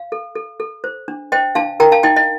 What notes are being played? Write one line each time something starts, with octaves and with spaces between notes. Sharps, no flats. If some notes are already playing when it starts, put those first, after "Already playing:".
Already playing: F5
A4
A4
A4
C5
D4
C5 D#5 G5
D4 F5 A5
A#4 G5 A#5
F5 A5
D#4 D#5 G5
D#5